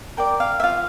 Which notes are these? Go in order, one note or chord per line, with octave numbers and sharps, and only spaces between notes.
A#4 D5 G5
F5
E5
F4 F5